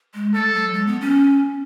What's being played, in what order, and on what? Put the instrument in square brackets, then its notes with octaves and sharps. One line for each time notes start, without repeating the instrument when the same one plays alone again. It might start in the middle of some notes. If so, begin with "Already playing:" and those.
[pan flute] G#3
[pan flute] A3 [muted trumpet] A4
[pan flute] F#3
G#3
B3
C#4